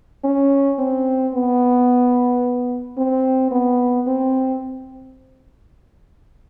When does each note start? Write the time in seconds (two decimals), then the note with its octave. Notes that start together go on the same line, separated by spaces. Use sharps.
0.24 C#4
0.79 C4
1.34 B3
2.98 C4
3.51 B3
4.07 C4